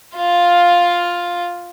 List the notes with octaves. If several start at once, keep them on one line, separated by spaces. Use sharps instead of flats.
F4 F5